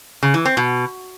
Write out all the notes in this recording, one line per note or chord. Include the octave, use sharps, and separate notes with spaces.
C#3
E3
C4
B2